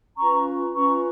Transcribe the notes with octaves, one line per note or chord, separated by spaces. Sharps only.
C#4 F4 B4 A#5 C#6
C#4 F4 B4 A#5 C#6